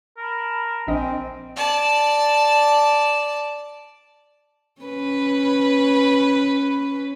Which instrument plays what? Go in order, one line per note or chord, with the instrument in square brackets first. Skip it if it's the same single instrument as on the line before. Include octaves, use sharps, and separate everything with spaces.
[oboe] A#4 [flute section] A5 B5
[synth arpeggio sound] A#1 D4 D#5 [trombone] C4 [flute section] G5 G#5
[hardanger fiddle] D5 A5
[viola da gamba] C#4 B4